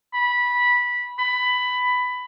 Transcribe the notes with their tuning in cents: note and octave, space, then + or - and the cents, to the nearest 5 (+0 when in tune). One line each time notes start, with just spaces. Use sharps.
B5 -15
B5 +15